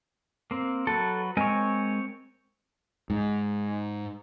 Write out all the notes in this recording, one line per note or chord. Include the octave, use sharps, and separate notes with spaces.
A#3 C4
F#3 A4 B4
G#3 C4 A#4 C#5 G#5
G#2